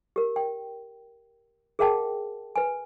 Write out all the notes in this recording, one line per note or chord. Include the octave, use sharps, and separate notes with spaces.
G4 A#4
G5
G#4 A#4 E5 F#5 G5 A5
B4 G#5